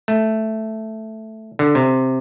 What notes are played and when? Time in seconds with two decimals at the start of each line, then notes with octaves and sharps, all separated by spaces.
0.08 A3
1.59 D3
1.75 C3